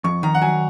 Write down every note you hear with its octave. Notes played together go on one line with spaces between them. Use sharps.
F2 C#6
D#3 A#5
F#5
F#3 G#5